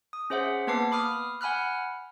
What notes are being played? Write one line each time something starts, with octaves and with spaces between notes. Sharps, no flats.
D#6
C#4 G#4 C5 E5 F#5
A#3 B3 B4 A5 D6 C7
B5 D6 D#6 F6
F#5 G#5 B5 F6 F#6